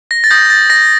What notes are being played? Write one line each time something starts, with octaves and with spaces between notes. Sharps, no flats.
A#6
A6
D#6 G6 A#6
A6
A#6